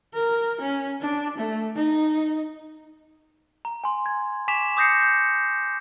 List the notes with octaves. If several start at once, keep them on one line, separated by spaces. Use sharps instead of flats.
A#4
C#4
D4
A3
D#4
A#5
G#5 C6
G#6
G#5 C#6 D6 B6 E7 F7
D6 D#6 G6 A#6 C7 C#7
G6